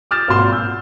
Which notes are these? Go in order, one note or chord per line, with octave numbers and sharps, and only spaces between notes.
D6 D#6 F6 G6 A6 E7
G#1 A#2 F#4 C6 E7
E6 G6